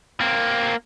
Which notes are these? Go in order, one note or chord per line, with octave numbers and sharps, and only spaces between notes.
A#3 C4